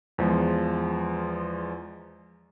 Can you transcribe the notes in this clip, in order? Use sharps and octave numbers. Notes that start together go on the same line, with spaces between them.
E2 F3 G#3